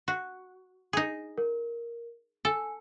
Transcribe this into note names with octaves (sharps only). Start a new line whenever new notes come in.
F#4
D#4 G#4
A#4
A4 G#5